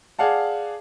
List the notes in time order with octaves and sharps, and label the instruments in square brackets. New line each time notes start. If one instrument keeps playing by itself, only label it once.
[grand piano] G#4 D5 F5 F#5 A5